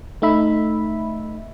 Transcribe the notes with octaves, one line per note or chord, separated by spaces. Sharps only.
A3 D#4 E5 B5